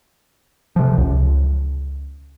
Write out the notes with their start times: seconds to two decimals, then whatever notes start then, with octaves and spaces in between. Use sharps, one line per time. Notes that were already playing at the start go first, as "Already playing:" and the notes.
0.76 C3 F3
0.98 C#2